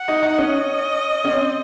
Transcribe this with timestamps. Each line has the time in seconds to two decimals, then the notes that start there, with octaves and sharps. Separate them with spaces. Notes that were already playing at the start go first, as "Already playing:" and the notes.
Already playing: F#5
0.08 D#4
0.23 D#4
0.38 C#4 D#5
1.24 C#4
1.30 C4